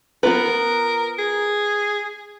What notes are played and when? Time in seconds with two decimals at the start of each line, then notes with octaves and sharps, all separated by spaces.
0.23 B3 F4 A#4 B4
1.18 G#4